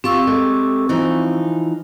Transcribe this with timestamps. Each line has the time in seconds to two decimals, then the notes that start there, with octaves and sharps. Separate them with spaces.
0.04 C4 F4 G4 C#6 E6
0.27 G#3 A3 G4
0.89 E3 F3 D#4